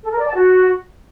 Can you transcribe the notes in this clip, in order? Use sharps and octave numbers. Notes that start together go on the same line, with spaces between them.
A4
A#4
D5
A5
F#4